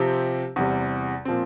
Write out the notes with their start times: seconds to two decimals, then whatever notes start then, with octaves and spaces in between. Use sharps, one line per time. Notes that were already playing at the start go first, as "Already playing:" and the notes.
Already playing: C3 F3 C4 G4
0.56 E2 C3 G3
1.25 A#2 F3 C4